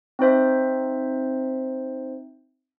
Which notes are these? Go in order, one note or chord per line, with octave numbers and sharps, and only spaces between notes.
C4 D#4 C5 E5